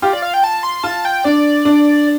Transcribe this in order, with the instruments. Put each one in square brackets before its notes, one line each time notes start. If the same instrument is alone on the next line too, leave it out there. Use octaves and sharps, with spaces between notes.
[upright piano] F4 [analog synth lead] G4
[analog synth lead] D5
F5
G5
A5
C6
[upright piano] F4 [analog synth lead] A5
[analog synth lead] G5
[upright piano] D4 [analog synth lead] D5
[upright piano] D4